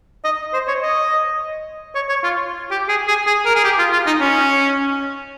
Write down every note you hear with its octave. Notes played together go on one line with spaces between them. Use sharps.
D#5
C5
C#5
D#5
C#5
C#5
F4
G4
G#4
G#4
G#4
A#4
G#4
G4
F4
F4
D#4
C#4